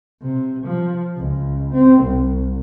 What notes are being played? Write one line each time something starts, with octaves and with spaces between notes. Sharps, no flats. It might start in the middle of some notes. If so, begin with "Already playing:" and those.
C3
F3
C#2
C4
C2